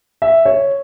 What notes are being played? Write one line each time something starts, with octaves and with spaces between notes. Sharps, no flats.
E5
C#5